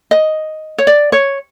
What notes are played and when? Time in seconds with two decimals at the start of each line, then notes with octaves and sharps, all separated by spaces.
0.11 D#5
0.78 C#5
0.87 D5
1.12 C#5